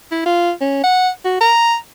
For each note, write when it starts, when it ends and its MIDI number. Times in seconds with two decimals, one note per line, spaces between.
0.12 0.25 64
0.26 0.51 65
0.61 0.83 61
0.84 1.09 78
1.25 1.37 66
1.41 1.76 82